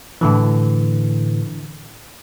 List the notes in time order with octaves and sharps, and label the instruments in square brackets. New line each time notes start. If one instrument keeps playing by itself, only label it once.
[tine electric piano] A2 D3 E3